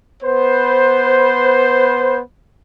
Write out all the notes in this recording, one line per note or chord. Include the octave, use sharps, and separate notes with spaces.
B3 B4 C5